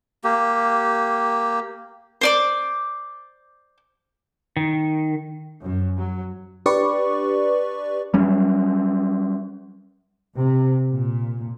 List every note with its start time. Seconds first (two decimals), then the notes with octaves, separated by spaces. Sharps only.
0.24 A#3 G4
2.21 C5 D5 D6
4.57 D#3
5.61 F#2
5.96 F#3
6.66 D4 G4 B4 D5 C#6
8.14 F#3 G3 C#4
10.37 C3
10.90 A#2